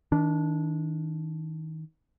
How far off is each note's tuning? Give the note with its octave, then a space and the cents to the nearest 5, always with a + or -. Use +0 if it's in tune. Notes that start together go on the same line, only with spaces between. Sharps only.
D#3 +30 D4 -10